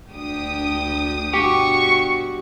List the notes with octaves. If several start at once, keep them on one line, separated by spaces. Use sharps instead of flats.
D2 D4 G4 D#6
G2 B2 F#4 G4 C#6